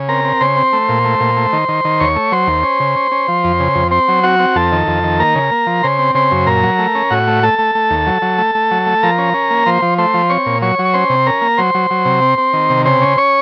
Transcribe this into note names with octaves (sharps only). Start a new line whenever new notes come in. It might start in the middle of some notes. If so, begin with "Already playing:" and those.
Already playing: C#3
C4 A#4 A#5
C4
C#3 C5 C6
C4
A3
A#2
A3
A#2
A3
D#3
D#3
D#3
D#2 C#5 C#6
A3
F#3 C5 C6
D#2
C#4
C#3
C#4
C#4
F3
F2
C#3
F2
C4 C5 C6
F#3
C4 F#4 F#5
C4
F2 A4 A5
D#3
F2
D#3
A#3 A#4 A#5
C#3
A#3
F3
C#3 C5 C6
C4
C#3 C5 C6
F#2
A#2 A#4 A#5
F#3
A3
C#4
A2 F#4 F#5
A3
A3 A4 A5
A3
A3
D#2
F#3
F#3
A3
A3
F#3
A3
F3 A#4 A#5
C#4
C#4
A#3
F3 C5 C6
F3
A3 C5 C6
F3
C4 C#5 C#6
A#2
F#3 C#5 C#6
F#3
C#6
C#4 C5 C6
C3
C#4 A#4 A#5
A#3
F#3 C5 C6
F#3
F#3
C3
C4
C4
D#3
C3
C#3 C5 C6
C#4
C#4 C#5 C#6